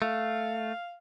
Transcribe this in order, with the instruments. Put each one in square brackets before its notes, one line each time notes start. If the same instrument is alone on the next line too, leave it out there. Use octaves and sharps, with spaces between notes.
[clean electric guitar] A3 [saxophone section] F5